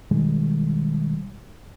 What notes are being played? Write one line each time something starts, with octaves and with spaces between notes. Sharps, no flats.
B2 D#3 G3 G#3